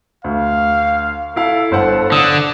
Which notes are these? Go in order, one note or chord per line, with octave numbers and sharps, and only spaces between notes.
D2 F5
E4 A4 F5
G1 C5 F#5
D3 D#6 F#6